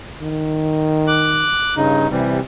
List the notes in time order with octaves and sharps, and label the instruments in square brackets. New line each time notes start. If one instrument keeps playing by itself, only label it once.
[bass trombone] D#3
[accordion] D6 F#6
[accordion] G2 D#4 [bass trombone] C#3
[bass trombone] C3 [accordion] E3 G3